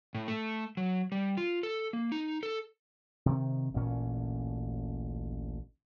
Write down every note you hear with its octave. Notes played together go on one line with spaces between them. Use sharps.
A2
A3
F#3
G3
F4
A4
A#3
D#4
A4
C3 D#3
A1 D2 A#2 C#4